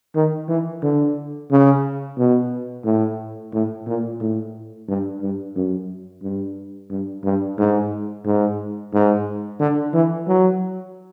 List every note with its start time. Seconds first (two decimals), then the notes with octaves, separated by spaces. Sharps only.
0.15 D#3
0.48 E3
0.82 D3
1.51 C#3
2.18 B2
2.84 A2
3.53 A2
3.87 A#2
4.20 A2
4.88 G2
5.21 G2
5.55 F#2
6.23 G2
6.90 G2
7.24 G2
7.58 G#2
8.25 G#2
8.93 G#2
9.60 D3
9.94 E3
10.27 F#3